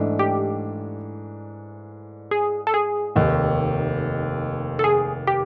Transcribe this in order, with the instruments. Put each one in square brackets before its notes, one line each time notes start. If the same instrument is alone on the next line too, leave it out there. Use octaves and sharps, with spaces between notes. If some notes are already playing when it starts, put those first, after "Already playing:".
Already playing: [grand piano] G#2 E3 A3 D4
[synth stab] G4
G#4
A4
G#4
[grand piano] F1 D#2 D#3
[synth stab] A4
G#4
G4